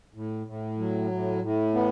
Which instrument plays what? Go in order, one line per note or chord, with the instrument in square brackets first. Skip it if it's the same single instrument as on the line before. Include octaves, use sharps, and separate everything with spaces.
[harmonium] A2
A2
F#3
A2
A2
B3